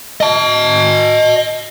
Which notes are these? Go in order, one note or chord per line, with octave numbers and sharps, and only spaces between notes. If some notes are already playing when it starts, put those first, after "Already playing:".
D#5 A5